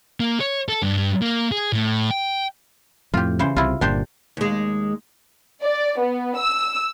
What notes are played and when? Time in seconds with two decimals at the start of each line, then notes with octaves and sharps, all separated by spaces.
0.20 A#3
0.40 C#5
0.69 A4
0.82 G2
1.22 A#3
1.52 G#4
1.73 A2
2.11 G5
3.14 F2 A2 F4 G4
3.39 C#3 E3 C5
3.56 C2 C3 E4 F4
3.81 G1 A#2 D4 G4 C5
4.37 D#2 G#3
5.62 D5
5.99 B3
6.38 E6